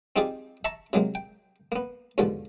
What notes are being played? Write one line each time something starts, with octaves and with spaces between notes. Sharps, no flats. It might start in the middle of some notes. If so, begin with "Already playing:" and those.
C4 D#4 F4 G4 G#4 D5
E5 A5 A#5 C#6
C3 F#3 G#3 A#3
G5
A#3 B3
D#2 G#2 B2 D3 F3